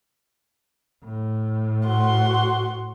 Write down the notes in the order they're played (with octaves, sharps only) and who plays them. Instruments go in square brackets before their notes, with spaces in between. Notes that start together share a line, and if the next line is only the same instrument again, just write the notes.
[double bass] A2
[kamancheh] F#4 C6